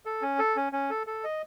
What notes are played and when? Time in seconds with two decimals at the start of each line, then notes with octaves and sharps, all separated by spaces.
0.06 A4
0.22 C#4
0.39 A4
0.56 C#4
0.73 C#4
0.90 A4
1.07 A4
1.24 D#5